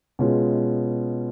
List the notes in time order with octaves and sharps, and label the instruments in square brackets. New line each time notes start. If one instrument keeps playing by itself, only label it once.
[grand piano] B2 G#3 C#4 F4